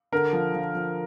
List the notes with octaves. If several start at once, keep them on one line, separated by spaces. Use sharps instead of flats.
D3 A#4
F3
F3
F3